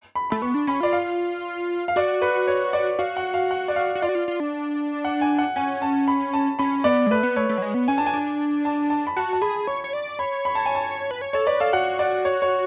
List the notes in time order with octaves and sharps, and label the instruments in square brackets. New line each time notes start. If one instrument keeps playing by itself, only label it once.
[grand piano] B5
[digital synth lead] A3 [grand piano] B5
[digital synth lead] B3 [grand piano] C#6
[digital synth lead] D4
[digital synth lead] C#4 [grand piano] B5
[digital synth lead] F4 [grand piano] D5
[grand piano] F5
F5
[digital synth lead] F#4 [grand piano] D5
[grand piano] B4
C#5
D5
[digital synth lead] F#4 [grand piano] F5
[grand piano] F#5
F5
F#5
D5
F5
[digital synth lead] F#4
[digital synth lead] F4 [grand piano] D5
[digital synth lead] F#4
F4
F4
D4
[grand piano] F#5
G#5
F#5
[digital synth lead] C#4 [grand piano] G#5
[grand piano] A5
B5
A5
[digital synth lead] C#4 [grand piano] B5
[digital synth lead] B3 [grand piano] D5
[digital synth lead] G#3
[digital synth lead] A3 [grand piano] B4
[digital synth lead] B3
[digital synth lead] A3 [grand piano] C#5
[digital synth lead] A3
F#3
G#3
B3
[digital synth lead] C#4 [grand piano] G#5
[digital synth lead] D4 [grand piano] A5
[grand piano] G#5
[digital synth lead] D4
[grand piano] A5
A5
B5
[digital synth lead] F#4 [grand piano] A5
[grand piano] A5
[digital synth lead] G#4 [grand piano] B5
[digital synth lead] C#5 [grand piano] C#6
[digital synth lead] C#5
D5
[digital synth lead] C#5 [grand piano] B5
[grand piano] B5
A5
G#5
A5
[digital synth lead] B4
C#5
[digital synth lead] A4 [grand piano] C#5
[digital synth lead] B4 [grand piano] D5
[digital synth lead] A4 [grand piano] F5
[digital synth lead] F#4 [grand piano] F#5
[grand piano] D5
C#5
C#5